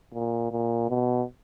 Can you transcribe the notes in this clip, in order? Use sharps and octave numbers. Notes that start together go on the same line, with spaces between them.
A#2
A#2
B2